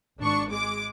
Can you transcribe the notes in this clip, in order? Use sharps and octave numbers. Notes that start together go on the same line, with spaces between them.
G#1 D4 C#6
G#3 D6